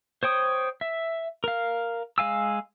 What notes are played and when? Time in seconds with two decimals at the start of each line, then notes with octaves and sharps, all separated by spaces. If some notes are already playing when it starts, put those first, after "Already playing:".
0.23 C5 C#5 G5 D#6
0.81 E5
1.44 A#4 F5
2.18 G#3 F5 G#5 E6